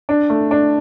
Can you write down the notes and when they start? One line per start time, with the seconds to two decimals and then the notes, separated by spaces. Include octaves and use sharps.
0.09 D4
0.30 A3
0.51 D4